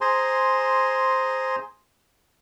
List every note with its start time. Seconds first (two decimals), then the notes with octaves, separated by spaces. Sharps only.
0.01 G#4 C5 G#5 A#5 C6